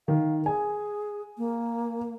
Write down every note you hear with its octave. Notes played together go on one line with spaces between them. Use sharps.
D#3 F5
G#4 G#5
A#3